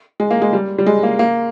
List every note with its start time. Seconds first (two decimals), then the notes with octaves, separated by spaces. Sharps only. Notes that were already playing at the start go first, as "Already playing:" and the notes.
0.20 G#3
0.31 A#3
0.42 G#3
0.53 G3
0.78 G3
0.86 G#3
1.03 A#3
1.19 A#3